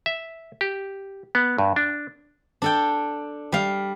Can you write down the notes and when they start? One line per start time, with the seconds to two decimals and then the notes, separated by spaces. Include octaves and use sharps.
0.06 E5
0.61 G4
1.35 B3
1.58 G2
1.76 D4
2.62 D4 A4 G5
3.52 G3 F5